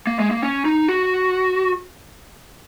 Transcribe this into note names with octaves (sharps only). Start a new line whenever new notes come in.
A#3
G#3
A#3
C#4
D#4
F#4